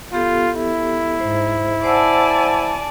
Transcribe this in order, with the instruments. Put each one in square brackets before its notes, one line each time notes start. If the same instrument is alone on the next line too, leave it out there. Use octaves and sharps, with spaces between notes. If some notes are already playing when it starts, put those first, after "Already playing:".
[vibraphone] B3 G4 A4 [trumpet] F4
[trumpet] E4
[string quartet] G#2 [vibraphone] C5
[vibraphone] C5 F#5 E6 [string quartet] D5 G#5 A5